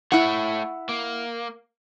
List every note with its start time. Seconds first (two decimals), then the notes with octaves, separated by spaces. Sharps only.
0.12 A3 E4 C#5 F#5
0.89 A#3